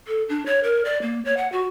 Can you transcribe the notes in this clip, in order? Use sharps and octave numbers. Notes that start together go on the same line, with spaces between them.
A4
D4
C#5
A#4
D5
A#3
C#5
F#5
F#4